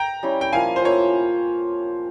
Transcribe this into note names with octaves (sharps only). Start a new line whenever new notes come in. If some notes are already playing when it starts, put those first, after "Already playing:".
Already playing: G5 A#5
G3 C#4 E4 G4
G5
F3 A#3 E4 F5 G#5
C5
F3 A#3 E4 C#5